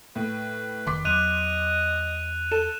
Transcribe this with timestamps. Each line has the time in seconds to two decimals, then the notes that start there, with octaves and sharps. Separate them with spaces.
0.16 A2 B4
0.87 F1 D#3 C6 D6 B6
1.05 E2 F#3 D#5 F#6 D#7 F7
2.52 A4 E7